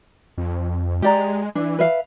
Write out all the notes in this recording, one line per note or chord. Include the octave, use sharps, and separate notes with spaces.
F2
G#3 G4 D5 A#5
E3 D4
B4 E5 F5